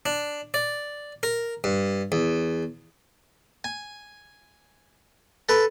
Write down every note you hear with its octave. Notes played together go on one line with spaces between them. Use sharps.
D4
D5
A#4
G2
E2
G#5
A4 B4